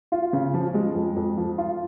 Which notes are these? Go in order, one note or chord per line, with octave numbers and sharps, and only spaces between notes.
F4
C#3
F3
G#3
F2
F2
F3
F4